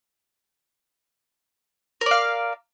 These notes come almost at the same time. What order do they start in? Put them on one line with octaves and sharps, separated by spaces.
A#4 D5 F5